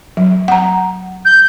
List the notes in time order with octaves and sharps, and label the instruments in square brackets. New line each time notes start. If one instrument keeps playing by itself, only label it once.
[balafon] F#3
F#5 A#5
[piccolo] G6